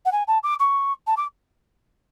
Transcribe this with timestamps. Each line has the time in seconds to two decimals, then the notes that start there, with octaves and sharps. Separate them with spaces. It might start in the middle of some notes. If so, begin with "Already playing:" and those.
0.05 F#5
0.12 G#5
0.27 A5
0.43 D6
0.59 C#6
1.07 A5
1.17 D6